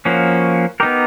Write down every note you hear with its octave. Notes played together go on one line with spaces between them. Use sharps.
F3 A#3 C#4 F#4
B3 D#4 G4 A#4